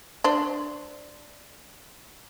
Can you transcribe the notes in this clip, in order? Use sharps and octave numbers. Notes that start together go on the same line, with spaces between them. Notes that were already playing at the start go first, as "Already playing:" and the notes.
D4 C5